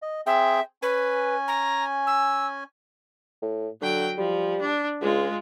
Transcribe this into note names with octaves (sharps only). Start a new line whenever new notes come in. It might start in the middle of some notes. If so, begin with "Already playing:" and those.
D#5
C4 G#4 E5 G5
C#4 B4 G#5
A#5
E6
A2
D3 F#3 G5
F3 G3
D4
C#2 G#3 F4